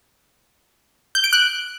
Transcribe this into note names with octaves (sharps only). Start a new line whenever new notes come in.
G6
D7
F#6